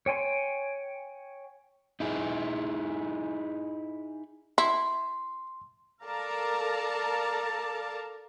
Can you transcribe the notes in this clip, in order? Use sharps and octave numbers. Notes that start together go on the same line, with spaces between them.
C#5 G5 G#5 C6
D#4 E4 G#4
E4 C6
A4 A#4 D5 F5 A5 A#5